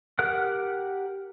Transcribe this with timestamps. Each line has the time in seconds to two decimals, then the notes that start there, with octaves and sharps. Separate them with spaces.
0.19 G4 A#4 F#5 F6 F#6